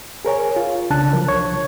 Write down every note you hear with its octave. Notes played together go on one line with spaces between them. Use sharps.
G#4 A#4 C#5 G#5
F4
C2 C#3 D4 A5 F#6
F3 F#3 A#4
C2 C#5 C#6 G#6